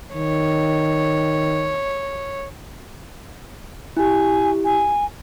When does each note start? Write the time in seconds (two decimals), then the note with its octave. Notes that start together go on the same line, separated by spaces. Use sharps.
0.14 D#3 C#5
3.97 E4 G4 G#5
4.64 G#5